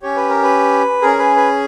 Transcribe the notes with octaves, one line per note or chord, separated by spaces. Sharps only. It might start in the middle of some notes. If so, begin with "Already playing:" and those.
C#4 G4 C#5
B4
A#4
B4
C#4 G#4 A#4
B4
B4